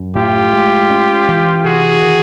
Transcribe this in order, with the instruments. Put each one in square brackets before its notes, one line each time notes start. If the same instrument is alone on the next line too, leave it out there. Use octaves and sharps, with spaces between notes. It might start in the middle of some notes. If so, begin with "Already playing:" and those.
Already playing: [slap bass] F#2
[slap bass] A2 [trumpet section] F4 G4
[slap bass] G#3
C#4
E3
[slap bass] C3 [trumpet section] F#4 G#4
[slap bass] D#3